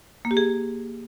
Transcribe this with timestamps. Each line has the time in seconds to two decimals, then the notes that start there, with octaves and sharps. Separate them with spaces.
0.25 A#3
0.31 G4
0.37 G#4